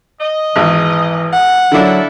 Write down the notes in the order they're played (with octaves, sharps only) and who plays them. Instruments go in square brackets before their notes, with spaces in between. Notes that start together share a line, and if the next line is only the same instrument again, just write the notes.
[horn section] D#5
[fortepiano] G#1 E2 [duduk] E3
[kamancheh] F#5
[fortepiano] D3 D4 [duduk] F#3 [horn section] A#3 E4 A4